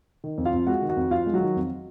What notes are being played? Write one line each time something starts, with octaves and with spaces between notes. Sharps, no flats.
D#3
F2
F4 F5
F2
G#3 F#4 F#5
D#3
F#4 F#5
F2
F2 F4 F5
G#3
F#3 F#4
D#3
F2